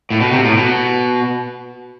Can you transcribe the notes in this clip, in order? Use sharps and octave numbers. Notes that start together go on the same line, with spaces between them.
A2
B2
C3
A2
B2